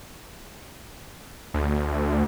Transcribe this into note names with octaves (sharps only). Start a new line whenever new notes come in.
D2